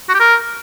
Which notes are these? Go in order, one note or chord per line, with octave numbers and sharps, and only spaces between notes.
F#4
G4
A#4